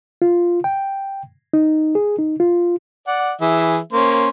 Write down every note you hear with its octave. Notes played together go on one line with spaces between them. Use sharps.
F4
G5
D#4
G#4
D#4
F4
D5 F#5
E3 G#4 E5
A#3 C#4 C5